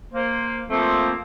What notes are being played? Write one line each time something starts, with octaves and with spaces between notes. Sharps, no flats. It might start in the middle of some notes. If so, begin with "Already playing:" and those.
A#3 C5
F3 A3 A#3 C4